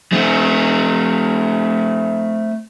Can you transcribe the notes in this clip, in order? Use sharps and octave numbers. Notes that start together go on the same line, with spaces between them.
A3 C4